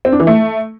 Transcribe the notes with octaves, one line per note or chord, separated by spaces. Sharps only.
C4
D4
E3
A3